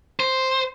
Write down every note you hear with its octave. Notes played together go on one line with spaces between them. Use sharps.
C5